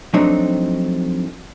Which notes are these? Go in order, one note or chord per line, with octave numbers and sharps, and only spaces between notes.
F3 F#3 A3 C4 D4 D#4